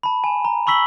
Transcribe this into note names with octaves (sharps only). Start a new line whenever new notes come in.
A5 B5
G#5 E7
A#5
B5 C#6 E6 B6 F#7 G7